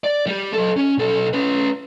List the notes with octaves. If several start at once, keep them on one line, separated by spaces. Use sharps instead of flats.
D5
G3 G4
F#3 A4
C#4
B1 A4
C#4 B4